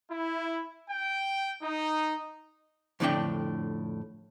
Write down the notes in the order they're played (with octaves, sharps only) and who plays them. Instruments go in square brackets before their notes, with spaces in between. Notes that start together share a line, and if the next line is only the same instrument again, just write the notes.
[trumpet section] E4
G5
D#4
[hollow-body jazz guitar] F2 A2 D3 E3 D4 G5